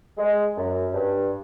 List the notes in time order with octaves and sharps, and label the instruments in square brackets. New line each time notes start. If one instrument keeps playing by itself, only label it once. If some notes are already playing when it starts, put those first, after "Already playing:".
[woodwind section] G#3
F#2
G2